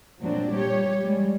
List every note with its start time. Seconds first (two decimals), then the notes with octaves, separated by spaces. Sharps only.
0.21 A#2 F#3 C4 D4
0.54 G3 G4 C#5
1.03 G3 G#3